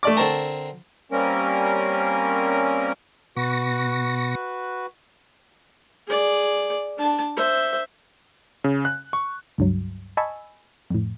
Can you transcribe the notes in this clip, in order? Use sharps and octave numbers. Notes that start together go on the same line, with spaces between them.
A3 D5 D6
D3 C4 A#4 A5
G3 A#3 C4 C#4 A#4
B2 F#4 B4 C#6 A#6
G#4 D5
D4 A5
C5 E5
C#3
F#6
C#6
C#2 G2 F#3
D#5 G#5 A5 B5 C#6 E6
F2 A2